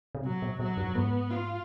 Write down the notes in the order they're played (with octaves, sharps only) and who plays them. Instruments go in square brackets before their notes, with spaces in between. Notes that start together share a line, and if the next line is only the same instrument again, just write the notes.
[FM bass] C3
[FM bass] B2 [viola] F#3
[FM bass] B2
[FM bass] B2 [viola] F#3
[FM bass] F#2
[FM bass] G#2 [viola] B3
[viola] F4